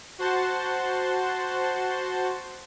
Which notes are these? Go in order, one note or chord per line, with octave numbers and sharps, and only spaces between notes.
F#4 C5 F#5 A5 C6